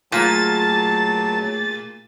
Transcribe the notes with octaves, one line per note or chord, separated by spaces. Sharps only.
A#2 F#3 A3 G#4 A5 A6